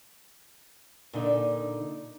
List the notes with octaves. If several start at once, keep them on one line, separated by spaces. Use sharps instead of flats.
A#2 D3 D#4 D5